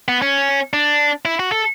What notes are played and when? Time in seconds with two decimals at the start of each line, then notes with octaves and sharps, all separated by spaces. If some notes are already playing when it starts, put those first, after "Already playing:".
0.08 B3
0.22 C#4
0.73 D4
1.25 E4
1.39 F#4
1.52 A4